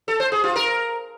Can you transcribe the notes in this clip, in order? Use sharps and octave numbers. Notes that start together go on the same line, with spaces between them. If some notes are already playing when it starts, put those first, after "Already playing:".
A4
C5
G#4
F4
A#4